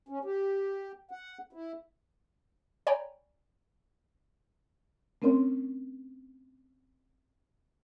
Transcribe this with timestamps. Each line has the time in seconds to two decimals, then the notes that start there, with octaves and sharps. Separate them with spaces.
0.09 C#4
0.25 G4
1.11 F#5
1.53 E4
2.87 C#5 D5 G5 G#5 A#5 B5
5.22 A3 C4 C#4 A#4 C#5 C6